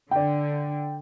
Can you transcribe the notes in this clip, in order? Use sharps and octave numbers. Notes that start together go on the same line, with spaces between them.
D3 D5 G5